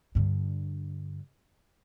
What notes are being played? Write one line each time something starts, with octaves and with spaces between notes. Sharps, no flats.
G2 D3